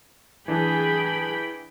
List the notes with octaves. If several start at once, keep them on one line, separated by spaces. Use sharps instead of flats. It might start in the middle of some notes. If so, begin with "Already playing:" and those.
E3 D4 G#4 G5 B5